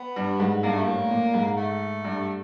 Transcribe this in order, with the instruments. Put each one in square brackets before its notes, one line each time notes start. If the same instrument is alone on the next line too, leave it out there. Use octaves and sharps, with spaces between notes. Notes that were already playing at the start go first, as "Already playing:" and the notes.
Already playing: [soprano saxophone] B3
[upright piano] G2
G#2
[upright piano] G2 [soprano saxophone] A#3
[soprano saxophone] A3
A#3
[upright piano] A2
A#2
G#2
[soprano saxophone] A3
[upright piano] G2